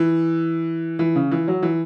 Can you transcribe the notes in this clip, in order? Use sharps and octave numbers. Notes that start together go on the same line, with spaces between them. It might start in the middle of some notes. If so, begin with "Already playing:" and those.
Already playing: E3
E3
C#3
E3
F#3
E3